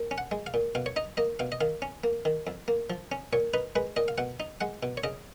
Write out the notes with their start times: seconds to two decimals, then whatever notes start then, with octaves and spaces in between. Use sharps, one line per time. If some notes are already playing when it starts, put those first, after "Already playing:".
Already playing: A#2
0.11 C#4
0.18 F#5
0.31 G#3
0.47 F5
0.54 A#2
0.75 B2 F5
0.86 C#5
0.96 D#4 D#5
1.17 A#3 D#5
1.39 B2 F5
1.52 D#5
1.61 D#3 F5
1.82 C#4
2.04 A#3
2.25 D#3
2.47 F2
2.68 A#3
2.90 F3
3.12 C#4
3.33 A#2 C#5
3.54 D#4 B4
3.76 G#3 B4
3.96 A#2 D#5
4.08 F5
4.18 B2 F#5
4.40 D#4
4.61 G#3 F#5
4.83 B2
4.97 C#5
5.04 C#3 D#5